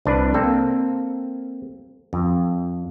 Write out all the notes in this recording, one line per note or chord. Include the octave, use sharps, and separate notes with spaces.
C2 D4 B4
A#3 C4 A4
F2